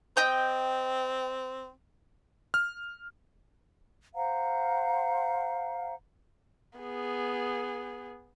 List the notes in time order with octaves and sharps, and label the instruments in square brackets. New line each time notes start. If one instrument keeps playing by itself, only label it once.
[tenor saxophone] C4 [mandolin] D#5 G5 G6
[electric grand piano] F6
[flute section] C5 F5 F#5 A#5
[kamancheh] B3 G#4